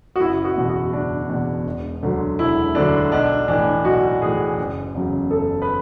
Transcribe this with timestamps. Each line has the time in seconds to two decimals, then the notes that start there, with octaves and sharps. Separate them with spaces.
0.16 F#4
0.20 F#1 E4
0.45 F#4
0.56 E2 B2
0.69 F#4
0.93 F#1 D4
1.29 E2 B2
1.66 E1
2.03 D2 D3 F#3
2.39 E1 E4
2.75 D2 D3 F#3 D4
3.12 B1 D4
3.48 A2 E3 D4
3.85 B1 F#4
4.21 A2 E3 G#4
4.57 F#1
4.95 E2 C#3 F#3
5.31 F#1 A4
5.62 B4